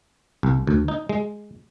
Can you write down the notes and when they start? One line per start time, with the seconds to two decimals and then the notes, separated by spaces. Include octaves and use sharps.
0.43 C2
0.67 D2
0.88 D#4
1.09 G#3